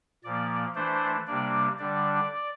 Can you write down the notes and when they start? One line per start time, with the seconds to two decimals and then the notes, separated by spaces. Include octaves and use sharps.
0.24 A#2 F3 A#3 D5
0.75 E3 A3 D4 C5
1.27 C3 G3 A#3 D4 D5
1.79 D3 G3 D4 D5